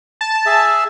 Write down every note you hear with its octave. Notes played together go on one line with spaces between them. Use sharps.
A5
G#4 E5